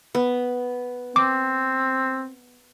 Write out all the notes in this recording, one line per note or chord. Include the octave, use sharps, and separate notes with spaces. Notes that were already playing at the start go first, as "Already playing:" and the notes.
B3
C4 D6